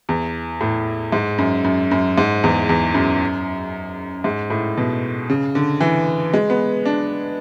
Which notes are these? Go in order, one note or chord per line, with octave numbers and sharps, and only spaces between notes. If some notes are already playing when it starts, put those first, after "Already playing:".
E2
A2
G#2
F#2
F#2
F#2
G#2
E2
E2
F#2
G#2
A2
B2
C#3
D3
E3
G#3
B3
D4